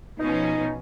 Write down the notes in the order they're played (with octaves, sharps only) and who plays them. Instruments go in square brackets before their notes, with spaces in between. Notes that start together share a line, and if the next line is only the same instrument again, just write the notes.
[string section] B2 F3 C#4 [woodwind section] D#4